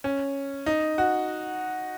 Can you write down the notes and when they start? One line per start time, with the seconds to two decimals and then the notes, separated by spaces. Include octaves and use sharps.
0.04 C#4
0.66 D#4
0.98 F#4